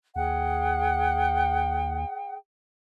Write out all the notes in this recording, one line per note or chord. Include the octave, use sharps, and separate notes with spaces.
D#2 G#4 F#5 G5